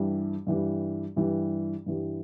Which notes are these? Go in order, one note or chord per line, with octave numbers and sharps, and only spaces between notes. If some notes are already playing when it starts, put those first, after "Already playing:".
Already playing: G2 E3 G3
G2 E3 G3
G2 E3 G3
G2 E3 G3